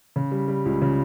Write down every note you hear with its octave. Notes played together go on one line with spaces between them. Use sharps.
C#3
G3
G3
C#2
C#3